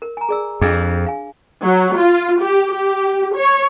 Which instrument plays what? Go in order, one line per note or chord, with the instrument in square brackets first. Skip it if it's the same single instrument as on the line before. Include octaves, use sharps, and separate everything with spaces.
[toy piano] A#4
G#5 A#5
G#4 D5 E6
[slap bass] F2 [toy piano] D4 G#4
[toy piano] F5 G#5
[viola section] F#3
F4
G4
G4
C#5